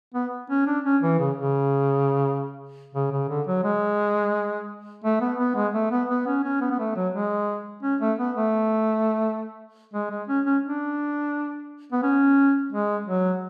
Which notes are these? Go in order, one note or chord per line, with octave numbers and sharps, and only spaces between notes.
B3
C#4
D4
C#4
E3
C#3
C#3
C#3
C#3
D3
F#3
G#3
A3
B3
B3
G#3
A3
B3
B3
C#4
C#4
B3
B3
A3
F#3
G#3
C#4
A3
B3
A3
G#3
G#3
C#4
C#4
D4
B3
C#4
G#3
F#3